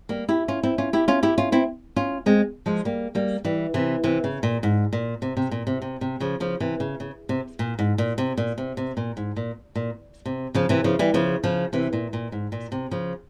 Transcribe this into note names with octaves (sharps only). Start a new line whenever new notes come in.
G3 A#3
E4 G4
C#4 F4
C4 E4
C#4 F4
E4 G4
C#4 F4
E4 G4
C#4 F4
C4 E4
C#4 F4
G#3 C4
F3 G#3
G3 A#3
G3 A#3
E3 G3
C3 E3
C3 E3
C#3
A#2
G#2
A#2
C3
C3
A#2
C3
C3
C3
C#3 F3
C#3 F3
C3 E3
C#3
C#3
C3
A#2
G#2
A#2
C3
A#2
C3
C3
A#2
G#2
A#2
A#2
C3
C#3 F3
C3 E3
C#3 F3
E3 G3
C#3 F3
C#3 F3
C3 E3
A#2
A#2
G#2
A#2
C3
C#3 F3